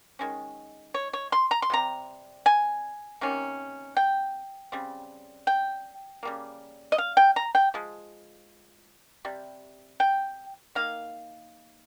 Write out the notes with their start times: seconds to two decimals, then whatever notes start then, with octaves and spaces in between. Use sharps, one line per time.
0.19 D#3 G#3 C#4
0.94 C#5
1.13 C#5
1.32 C6
1.51 A#5
1.62 C6
1.70 C3 G3 C4 A#5
2.46 G#5
3.21 C3 D#3 A#3 C#4
3.97 G5
4.72 C#3 G3 C4
5.47 G5
6.23 C#3 G3 A#3
6.92 D#5
6.98 F5
7.17 G5
7.36 A#5
7.55 G5
7.74 F3 G#3
9.25 C3 G3
10.00 G5
10.75 D#3 A#3 F5